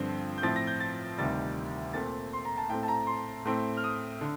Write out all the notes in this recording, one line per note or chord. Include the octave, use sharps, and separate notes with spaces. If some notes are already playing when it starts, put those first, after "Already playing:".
Already playing: G2 D3 F3 C4
G6
A2 F3 C4 A6
A#6
G6
A6
D2 C3 D#3 G3 A6
A#2 A3 C4 A6
C6
A#5
A5
A2 A3 C4 G5
A5
A#5
C6
A2 A3 C4
F6
D#6
D3